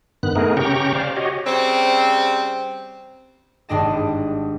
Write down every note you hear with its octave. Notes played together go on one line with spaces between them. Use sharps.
G2 D#3 B3 F#6
A3 B3 D#4 G#4 A#4
C#3 C#4 G4 G5 A#5 C#6
C5 D5 F5
F#4 G4 C#5 D#5
C#3 G3 C4
G#1 G2 D4 D#5 A5